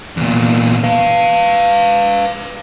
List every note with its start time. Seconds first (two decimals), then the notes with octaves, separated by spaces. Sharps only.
0.17 E2 A#2
0.83 B4 F5